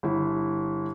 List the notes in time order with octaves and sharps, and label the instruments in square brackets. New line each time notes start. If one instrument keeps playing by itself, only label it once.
[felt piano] G1 E4